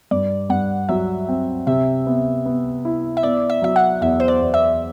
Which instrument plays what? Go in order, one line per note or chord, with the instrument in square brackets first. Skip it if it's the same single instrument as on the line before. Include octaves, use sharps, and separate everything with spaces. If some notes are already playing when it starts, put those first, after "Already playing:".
[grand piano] G2 [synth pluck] D5
[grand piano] G2 [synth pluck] F#5
[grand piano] F#3 [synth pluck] E5
[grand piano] C4
[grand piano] C3 [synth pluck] E5
[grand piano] B3
B3
E4
[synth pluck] E5
[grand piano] B3 [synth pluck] D5
[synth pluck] E5
[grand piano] F#3 [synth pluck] E5
[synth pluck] F#5
[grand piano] E2 [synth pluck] E5
[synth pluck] C5
D5
[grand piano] E2
[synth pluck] E5